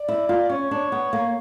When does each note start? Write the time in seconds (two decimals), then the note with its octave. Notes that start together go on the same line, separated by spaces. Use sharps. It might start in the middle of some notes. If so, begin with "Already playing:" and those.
Already playing: D5
0.08 E4
0.29 F4
0.50 C#4 C#5
0.71 D4
0.92 B3
1.13 A#3